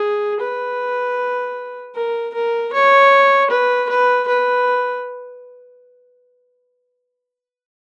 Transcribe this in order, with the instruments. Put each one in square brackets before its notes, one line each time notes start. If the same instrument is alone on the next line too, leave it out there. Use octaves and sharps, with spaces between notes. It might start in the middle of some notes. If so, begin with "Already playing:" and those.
Already playing: [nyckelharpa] G#4
B4
A#4
A#4
C#5
B4
B4
B4